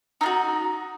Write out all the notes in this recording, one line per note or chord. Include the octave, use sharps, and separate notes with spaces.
D#4 F4 F#4